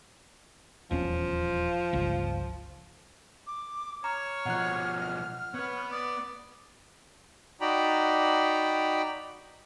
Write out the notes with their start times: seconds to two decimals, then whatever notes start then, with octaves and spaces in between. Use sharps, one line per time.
0.91 D#1 E2 F3 C#4
1.93 G1 C#2
3.47 D6
4.04 C#5 A#5 F6
4.46 B2 F3 F#5 F#6
5.54 B3 B4 C#5
5.92 D5 D#6
7.61 D#4 F#4 D5 G5 A#5 B5